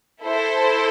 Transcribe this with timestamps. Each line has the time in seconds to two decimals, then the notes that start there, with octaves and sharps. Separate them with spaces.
0.23 E4 A4 C5